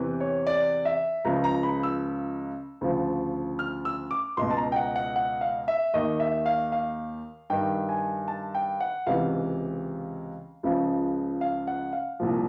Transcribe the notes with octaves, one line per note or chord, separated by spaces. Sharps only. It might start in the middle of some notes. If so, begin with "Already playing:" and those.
Already playing: E2 C3 E3
C#5
D5
E5
C#2 C#3 F3 A#5
A#5
B5
E6
D2 C#3 F3
F6
E6
D6
C#2 B2 C6
A5
A#5
G5
F#5
F#5
F#5
F5
E5
D#2 D#3 D#5
E5
F5
F5
G2 D#3 G5
G#5
A5
G5
F#5
C#2 C3 E3 F5
C#2 C#3 F3
F5
F#5
F5
C2 A#2 F3